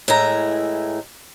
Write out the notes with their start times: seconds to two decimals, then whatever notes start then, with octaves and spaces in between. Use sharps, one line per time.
0.08 A2 E3 G#3 E4 A#5